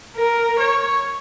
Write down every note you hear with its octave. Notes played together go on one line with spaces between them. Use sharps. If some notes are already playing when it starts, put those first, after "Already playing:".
A#4
C#5